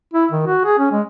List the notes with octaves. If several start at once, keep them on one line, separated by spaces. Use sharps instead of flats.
E4
D#3
F#4
G#4
C#4
G#3